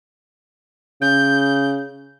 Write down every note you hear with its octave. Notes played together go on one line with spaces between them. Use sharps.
C#3 G6